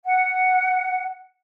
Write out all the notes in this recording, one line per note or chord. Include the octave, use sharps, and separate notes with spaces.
F#5